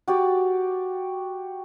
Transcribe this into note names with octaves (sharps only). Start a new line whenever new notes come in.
F#4 G4 D5